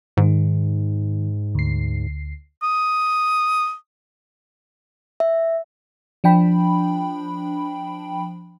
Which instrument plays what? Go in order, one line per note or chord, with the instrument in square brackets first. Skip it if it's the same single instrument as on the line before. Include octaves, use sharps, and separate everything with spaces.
[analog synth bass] G#2 [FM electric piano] D#3
[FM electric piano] D2 C7
[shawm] D#6
[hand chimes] E5
[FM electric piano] F3 D4 G5 B5